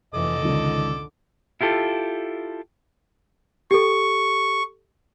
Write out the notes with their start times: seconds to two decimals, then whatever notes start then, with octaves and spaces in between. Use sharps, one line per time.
0.14 F1 A#2 E3 A4 D#5 D6
0.43 C#2 D3 D#3
1.61 E4 F4 G4 A4
3.71 G4 A4 C#6